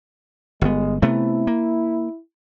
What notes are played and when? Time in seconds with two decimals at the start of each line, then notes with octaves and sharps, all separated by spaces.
0.61 G1 G#3 B3
1.02 C3 A3 B3 E4
1.47 A#3